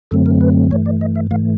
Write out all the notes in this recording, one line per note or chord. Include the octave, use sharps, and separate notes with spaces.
F#2 D3 F#3 A3 C4 A4
A#4
B4
G2 E3 A3 C#5
D5
D#5
E5
G#2 E3 A3 F5